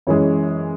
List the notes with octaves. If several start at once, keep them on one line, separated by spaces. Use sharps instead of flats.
F#2 E3 G#3 C#5